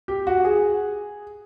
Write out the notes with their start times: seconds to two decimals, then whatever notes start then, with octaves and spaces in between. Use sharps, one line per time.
0.08 G4
0.27 F#4
0.45 G#4